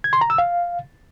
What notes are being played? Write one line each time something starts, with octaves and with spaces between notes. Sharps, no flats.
G#6
C6
A#5
E6
F5